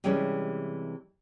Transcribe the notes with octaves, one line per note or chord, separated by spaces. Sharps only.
C3 E3 G3 G#3 C#4